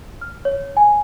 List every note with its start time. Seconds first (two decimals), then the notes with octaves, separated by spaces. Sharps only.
0.21 F6
0.45 C#5
0.77 G#5